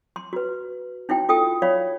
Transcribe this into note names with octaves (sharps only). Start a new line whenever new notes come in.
C6
F#4 B4
D#4 E4 F#4 G5
F4 A4 G5 D#6
C#5 D5 F5 B5